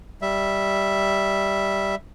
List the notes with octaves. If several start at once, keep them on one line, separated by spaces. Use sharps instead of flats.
G3 E5